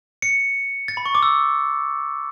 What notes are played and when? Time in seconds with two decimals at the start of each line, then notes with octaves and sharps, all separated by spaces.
0.22 C#7
0.88 A6
0.97 B5
1.06 C#6
1.15 D6
1.23 E6